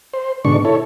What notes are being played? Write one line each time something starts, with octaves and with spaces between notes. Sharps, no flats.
C5
G#2 B2 D3 D4 C#6
E4 A4 C#5